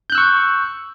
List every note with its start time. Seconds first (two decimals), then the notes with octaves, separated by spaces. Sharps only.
0.10 G6
0.12 F#6
0.15 E6
0.18 C#6